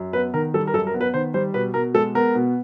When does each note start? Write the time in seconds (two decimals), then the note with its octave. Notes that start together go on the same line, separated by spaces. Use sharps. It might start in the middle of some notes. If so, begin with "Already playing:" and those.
Already playing: F#2
0.13 B3 B4
0.34 D#3 A#4
0.54 G3 A4
0.67 A#4
0.74 F#2 A4
0.87 A#4
0.94 B3
1.01 B4
1.14 D#3 C5
1.34 G3 C5
1.54 B2 B4
1.74 B2 A#4
1.94 G#3 A4
2.15 B3 A#4
2.35 B2